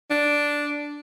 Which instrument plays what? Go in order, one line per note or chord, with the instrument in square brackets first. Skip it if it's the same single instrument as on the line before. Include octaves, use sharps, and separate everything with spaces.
[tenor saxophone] D4